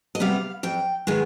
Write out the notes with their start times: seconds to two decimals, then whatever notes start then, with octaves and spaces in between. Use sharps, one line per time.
0.15 D#5
0.20 C3 G3 B3 F5
0.63 F2 G5
1.07 D#3 G#3 B3 G#5